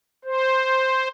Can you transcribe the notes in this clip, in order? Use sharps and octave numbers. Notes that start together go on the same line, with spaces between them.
C5